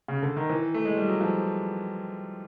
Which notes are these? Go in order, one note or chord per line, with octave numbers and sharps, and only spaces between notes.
C#3
D3
D#3
E3
A3
G#3
G3
F#3
F3